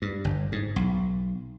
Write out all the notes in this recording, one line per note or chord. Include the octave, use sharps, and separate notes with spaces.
G2
G1
G#2
B1